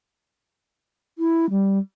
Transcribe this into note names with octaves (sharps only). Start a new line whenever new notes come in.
E4
G3